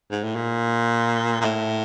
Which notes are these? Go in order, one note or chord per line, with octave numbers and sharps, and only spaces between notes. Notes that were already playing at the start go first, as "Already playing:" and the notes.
G#2
A2
A#2
A#2
A2